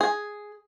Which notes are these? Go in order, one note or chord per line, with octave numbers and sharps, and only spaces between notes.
G#4